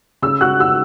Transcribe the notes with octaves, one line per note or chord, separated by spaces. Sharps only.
C#3 E6
F#4 F#6
F#4 E6